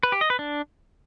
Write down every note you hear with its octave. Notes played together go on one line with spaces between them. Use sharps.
B4
G4
D#5
B4
D4